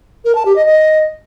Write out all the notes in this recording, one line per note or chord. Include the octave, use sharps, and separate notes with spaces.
A#4
A5
G4
D#5
D#5